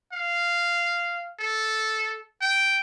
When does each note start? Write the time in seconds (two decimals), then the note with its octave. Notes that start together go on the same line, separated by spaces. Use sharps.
0.13 F5
1.39 A4
2.41 G5